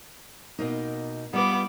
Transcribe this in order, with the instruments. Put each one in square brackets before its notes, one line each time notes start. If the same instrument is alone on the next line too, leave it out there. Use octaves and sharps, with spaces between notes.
[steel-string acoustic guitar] B2 A#3 D#4
[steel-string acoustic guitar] G3 F4 B4 [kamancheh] B3 D6